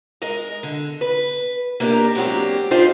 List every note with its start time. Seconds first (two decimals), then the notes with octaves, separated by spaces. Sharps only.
0.22 G#3 A#4 D#5
0.63 D3
1.01 B4
1.80 A#3 D4 D#4 F4 G4 A#4
2.15 F#3 G#3 A#3 C4 D4 G4
2.71 D4 D#4 F4 G4 G#4 C5